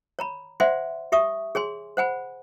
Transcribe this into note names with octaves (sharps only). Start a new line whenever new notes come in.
C#5 A#5 B5
C5 D5 E5 F#5 G#5 C6
G4 E5 C#6 D#6
G#4 C#5 G#5 C6
C5 F#5 G#5 B5